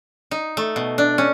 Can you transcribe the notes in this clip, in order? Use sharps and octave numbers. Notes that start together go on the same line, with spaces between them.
D#4
A3
B2
D4
C#4